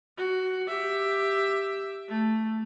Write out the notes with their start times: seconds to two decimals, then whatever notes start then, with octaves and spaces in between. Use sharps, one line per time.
0.18 F#4
0.68 G4 E5
2.09 A3